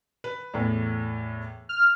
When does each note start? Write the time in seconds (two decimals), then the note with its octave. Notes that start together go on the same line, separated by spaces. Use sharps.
0.24 B4
0.54 E2 A2
1.69 F6